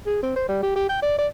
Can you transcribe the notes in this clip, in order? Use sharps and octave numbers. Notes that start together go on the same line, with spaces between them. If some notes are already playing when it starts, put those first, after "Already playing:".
G#4
C4
C5
G3
G4
G4
G5
D5
D5